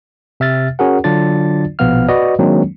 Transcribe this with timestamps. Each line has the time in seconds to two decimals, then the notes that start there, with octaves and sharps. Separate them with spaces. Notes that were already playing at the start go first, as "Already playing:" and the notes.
0.40 C3 E5 F6 A6
0.79 C#4 F#4 G#4 A#4 F#5
1.04 D3 F#3 D4 F4 D5 A6
1.79 A#1 B2 F3 B3 F5 F6
2.09 F#4 B4 D5 D#5
2.39 D#3 F#3 G#3 A#3 C4 D4